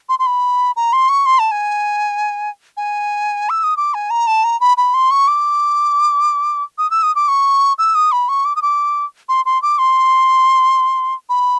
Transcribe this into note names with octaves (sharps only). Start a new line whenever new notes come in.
C6
C6
B5
A#5
C6
C#6
C6
A5
G#5
G#5
E6
D#6
D6
G#5
A#5
A5
A#5
B5
B5
C6
C#6
D6
D#6
E6
D#6
D6
C#6
E6
D#6
B5
C#6
D6
D#6
D6
C6
C6
D6
C6
B5